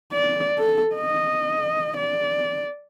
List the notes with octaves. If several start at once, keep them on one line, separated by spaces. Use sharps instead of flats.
D5
A4
D#5
D5